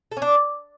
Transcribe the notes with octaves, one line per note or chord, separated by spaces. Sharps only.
A4
C#4
D4